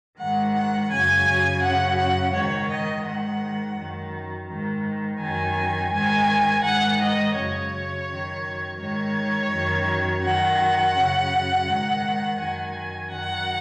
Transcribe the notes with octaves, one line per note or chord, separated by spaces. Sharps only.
G#2 D#3 F#5
F#5
F#2 C#3 G#5
F#2 C#3 F#5
F#5
G#2 D#3 C#5
D#5
G#2 D#3 F#5
F#2 D#3
G#2 D#3
F#2 D#3 G#5
G#2 D#3 G#5
G#2 D#3 F#5
D#5
F#2 C#3 C#5
F#2 D#3
G#2 D#3 C#5
F#2 D#3
F#2 D#3 F#5
F#2 C#3
G#2 D#3
F#2 D#3 G#5
F#2 D#3 F#5